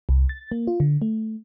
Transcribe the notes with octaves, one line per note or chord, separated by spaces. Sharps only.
C2
A6
A#3
F4
D3
A3